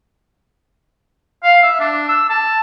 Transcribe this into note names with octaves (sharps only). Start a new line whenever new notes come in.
F5
E5
D4
E6
A5